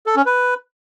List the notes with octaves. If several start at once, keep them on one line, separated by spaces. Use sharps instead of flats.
A4
C#4
B4